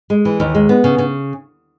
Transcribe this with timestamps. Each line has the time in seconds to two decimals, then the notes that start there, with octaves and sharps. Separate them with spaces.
0.10 G#3
0.25 E3
0.40 D#2
0.55 G#3
0.69 B3
0.84 C#3
0.98 C#3